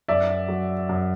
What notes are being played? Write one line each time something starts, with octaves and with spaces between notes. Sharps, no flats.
F#2 D5 E5
F#3
F#2